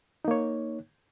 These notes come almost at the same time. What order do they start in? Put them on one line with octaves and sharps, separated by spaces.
D#4 A#3 C#5